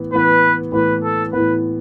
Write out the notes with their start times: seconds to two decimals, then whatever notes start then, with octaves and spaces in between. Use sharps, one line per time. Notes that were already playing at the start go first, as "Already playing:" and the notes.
Already playing: A2 E3 B3
0.12 A2 E3 B3 B4
0.72 A2 E3 B3 B4
1.03 A4
1.33 A2 E3 B3 B4